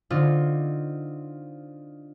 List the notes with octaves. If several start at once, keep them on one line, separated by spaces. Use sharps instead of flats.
D3 C4 D#4 F4